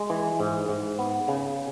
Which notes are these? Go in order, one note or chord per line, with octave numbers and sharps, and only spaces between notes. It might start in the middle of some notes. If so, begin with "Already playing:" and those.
Already playing: G#3
E3
G#2
G#2
B3
C#3